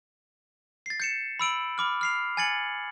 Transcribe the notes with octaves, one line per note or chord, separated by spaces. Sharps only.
A6 C7
G6 C#7 E7
B5 E6 D7 F#7
B5 D6 F6
F6 C7 F7
G#5 G#6 A6 C#7 F#7